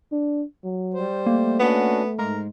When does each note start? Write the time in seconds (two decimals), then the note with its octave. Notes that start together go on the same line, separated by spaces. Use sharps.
0.12 D4
0.64 F#3
0.94 G3 C5
1.26 A3 A#3
1.59 B3 C#4 D4 F#4
2.19 G#2 G#3 A#4